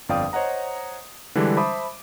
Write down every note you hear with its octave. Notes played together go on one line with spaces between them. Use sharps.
G1 F2 D5 F5 G5 D#6
C5 C#5 D#5 F#5 A#5
D3 E3 G3 G#3 D4
C5 E5 A5 B5 D6 D#6